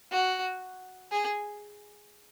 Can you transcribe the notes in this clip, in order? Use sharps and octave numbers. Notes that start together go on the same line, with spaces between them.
F#4
G#4